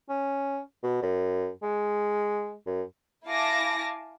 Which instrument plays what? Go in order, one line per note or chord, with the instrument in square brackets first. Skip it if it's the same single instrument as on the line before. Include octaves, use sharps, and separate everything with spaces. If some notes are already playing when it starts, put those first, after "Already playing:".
[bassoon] C#4
B2
F#2
G#3
F#2
[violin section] E4 F5 G#5 A5 D6 A#6